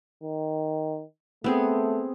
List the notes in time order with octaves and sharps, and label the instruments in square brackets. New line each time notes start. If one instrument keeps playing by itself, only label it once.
[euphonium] D#3
[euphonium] A3 [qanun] B3 C4 G#4